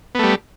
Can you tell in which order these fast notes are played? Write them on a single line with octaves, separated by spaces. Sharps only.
B3 A3 G3